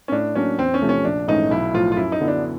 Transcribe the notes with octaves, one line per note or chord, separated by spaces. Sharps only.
C#4
A2 D4
F#3 A#3 C#4 D4
E2 C4
C#4
C3 F3 A3
C#4
A#1 D4
G#2 E3 A3 C#4 D#4
B1 E4
A2 F3 F4
F4
F#2 E4
D#4
D3 F#3 B3 E4
D4